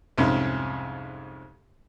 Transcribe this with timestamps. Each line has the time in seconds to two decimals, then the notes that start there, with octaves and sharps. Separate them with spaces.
0.18 C2 F2 G#2 C#4